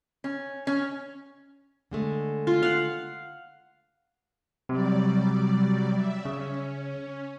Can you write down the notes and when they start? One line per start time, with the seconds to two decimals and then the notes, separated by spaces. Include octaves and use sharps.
0.24 C#4
0.67 C#4
1.91 D3 G#3 A3
2.47 F4
2.63 F5 F#5
4.69 C3 F#3 G3 D5
5.93 E5
6.25 C#3 C#4